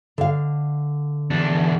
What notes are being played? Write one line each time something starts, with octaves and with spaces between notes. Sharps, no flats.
D3 F5
E2 D4